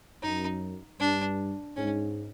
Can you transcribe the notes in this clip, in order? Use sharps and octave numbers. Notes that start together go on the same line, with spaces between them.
F#2 D#4
G2 D4
G#2 C#4